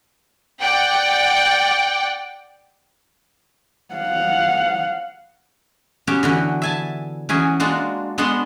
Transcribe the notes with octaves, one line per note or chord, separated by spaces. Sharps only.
D5 F#5 G5
F5 F#5
B3 C#4 F#4 G4
D3 E3 F#4
E5 G#5 A5
E3 C#4 F#4 G#4
G#3 A#3 D4 F4 F#4
G#3 B3 D4 F#4 F#5 C6